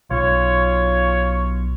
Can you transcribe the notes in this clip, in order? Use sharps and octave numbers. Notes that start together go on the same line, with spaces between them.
B1 F4 C#5